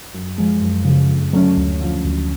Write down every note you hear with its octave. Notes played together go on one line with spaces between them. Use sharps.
F#2
F3 G#3
F#2
C#3 F3
F2
D3 F#3 A3 C#4
D2
D3 F3
D2